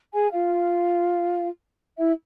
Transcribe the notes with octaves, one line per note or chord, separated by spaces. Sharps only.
G#4 G#5
F4 F5
E4 E5